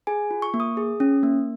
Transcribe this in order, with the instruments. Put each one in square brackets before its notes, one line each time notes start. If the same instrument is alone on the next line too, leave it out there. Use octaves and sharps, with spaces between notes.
[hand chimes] G#4 G#5
F4
C#6
A#3
D#6
G#4
C#4
A#3